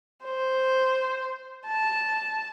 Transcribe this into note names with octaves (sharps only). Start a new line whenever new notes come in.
C5
A5